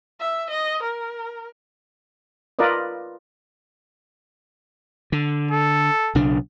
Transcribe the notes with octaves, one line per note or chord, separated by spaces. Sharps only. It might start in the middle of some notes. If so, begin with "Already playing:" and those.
E5
D#5
A#4
F4 A#4 B4 D5 D#5
D3
A4
B1 C#3 D4